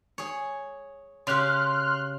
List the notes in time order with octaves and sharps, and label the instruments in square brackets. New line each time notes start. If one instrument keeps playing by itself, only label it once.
[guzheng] G#4 C#5
[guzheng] C#3 G4 [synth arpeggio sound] C6 F6 F#6